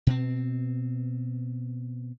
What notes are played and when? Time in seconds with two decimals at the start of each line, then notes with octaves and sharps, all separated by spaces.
0.07 B2 C4